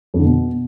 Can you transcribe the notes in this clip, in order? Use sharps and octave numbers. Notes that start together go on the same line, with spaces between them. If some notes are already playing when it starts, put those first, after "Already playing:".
F2
D3
B2